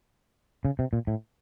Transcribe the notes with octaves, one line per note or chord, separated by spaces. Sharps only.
C#3
C3
A#2
A2